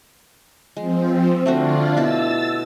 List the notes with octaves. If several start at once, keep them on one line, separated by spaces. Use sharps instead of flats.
F3 G#3 C4
D3 A3 C4 D4 F4 F#4
B2 E4 D5 E6 A6